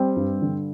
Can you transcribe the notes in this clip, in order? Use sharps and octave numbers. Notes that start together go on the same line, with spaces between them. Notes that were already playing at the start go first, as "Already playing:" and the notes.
Already playing: G3 C4
G2
D3